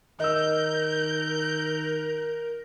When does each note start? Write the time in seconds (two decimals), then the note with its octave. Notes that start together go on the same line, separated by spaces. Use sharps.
0.20 D#3 A#4 D#5 E6 G6